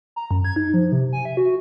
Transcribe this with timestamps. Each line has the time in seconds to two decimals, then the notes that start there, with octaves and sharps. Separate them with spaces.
0.16 A#5
0.31 F#2
0.45 G#6
0.56 D#4
0.74 F3
0.92 C3
1.13 G#5
1.25 E5
1.37 F#4